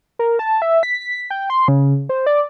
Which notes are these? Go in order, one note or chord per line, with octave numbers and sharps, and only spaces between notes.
A#4
A5
E5
B6
G5
C6
C#3
C5
D5